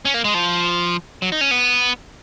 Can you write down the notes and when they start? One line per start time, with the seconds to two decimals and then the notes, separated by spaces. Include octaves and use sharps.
0.05 C#4
0.14 A#3
0.24 G#3
0.34 F3
1.22 F#3
1.32 D#4
1.41 C#4
1.51 B3